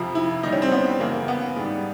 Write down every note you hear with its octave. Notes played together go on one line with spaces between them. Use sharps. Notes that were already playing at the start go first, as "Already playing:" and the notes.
Already playing: F2 C3 F3
E4
D#2 D#3 G3 D#4
C#4
C4
B3
F#2 C#3 E3 A#3
B3
G#2 D#3 G3